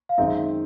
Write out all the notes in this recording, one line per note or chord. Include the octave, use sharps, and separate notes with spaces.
F5
F#2 D#3 G#3 C4 D#4 E5